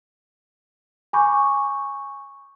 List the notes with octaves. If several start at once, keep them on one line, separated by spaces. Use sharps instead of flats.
G#5 B5 C#6 D6 G6